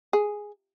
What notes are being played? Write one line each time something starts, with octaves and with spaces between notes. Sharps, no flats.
G#4